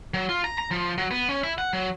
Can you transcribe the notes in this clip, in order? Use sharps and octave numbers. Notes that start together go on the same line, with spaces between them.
F#3
F4
A#5
A#5
F3
F#3
B3
C#4
E4
F#5
F#3